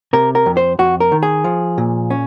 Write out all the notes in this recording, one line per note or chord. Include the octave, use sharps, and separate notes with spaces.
C3 A#4
A#4
F2
C5
F2 F#4
A#4
D#3
G#4
F3
A#2
C#4